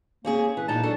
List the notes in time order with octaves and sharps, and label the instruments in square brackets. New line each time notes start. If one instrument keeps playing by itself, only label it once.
[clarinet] A#3 [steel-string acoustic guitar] C4 C#4 G#4
[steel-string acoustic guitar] E3 [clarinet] B4
[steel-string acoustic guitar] A#2 D#4 [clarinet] A5
[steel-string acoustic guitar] F#3 D4 A4